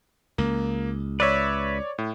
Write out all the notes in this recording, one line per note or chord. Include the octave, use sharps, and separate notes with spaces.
C#2 A#3
B4 C#5 D5 E5
A2